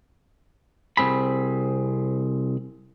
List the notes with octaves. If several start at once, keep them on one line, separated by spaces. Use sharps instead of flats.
C2 B2 C4 G#4 B5